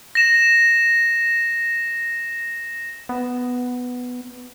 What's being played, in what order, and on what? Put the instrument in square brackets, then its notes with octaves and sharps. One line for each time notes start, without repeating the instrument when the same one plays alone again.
[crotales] A#6 E7
[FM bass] B3